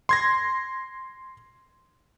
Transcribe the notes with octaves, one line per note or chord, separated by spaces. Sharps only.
C6 G#6 A#6